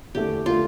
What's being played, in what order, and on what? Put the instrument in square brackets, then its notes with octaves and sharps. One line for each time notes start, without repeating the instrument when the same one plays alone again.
[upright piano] E2 D3 A3 [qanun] G4
[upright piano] D3 A3 [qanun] F4